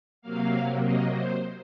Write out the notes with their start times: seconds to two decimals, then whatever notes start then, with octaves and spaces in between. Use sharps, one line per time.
0.22 C3 F#3 A#3 F5
0.82 D#5
1.11 C5